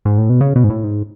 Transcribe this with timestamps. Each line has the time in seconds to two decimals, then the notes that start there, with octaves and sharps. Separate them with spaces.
0.05 G#2
0.18 A2
0.30 B2
0.41 C#3
0.56 B2
0.64 G#2
0.70 A2
0.84 G#2